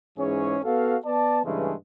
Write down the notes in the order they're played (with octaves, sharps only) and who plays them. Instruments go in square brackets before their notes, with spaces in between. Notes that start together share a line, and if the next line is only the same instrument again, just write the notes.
[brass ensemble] G#2 E3 C#4 G#4 C#5
B3 F#4 A4 F5
B3 D5 A5
G2 C#3 E3 G#3 A3